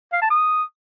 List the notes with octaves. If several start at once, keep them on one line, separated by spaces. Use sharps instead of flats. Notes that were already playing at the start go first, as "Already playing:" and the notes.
F5
A5
D#6